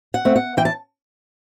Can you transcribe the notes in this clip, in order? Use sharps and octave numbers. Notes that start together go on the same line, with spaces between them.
F#5
A3 C4
F#5
E3 G5
A5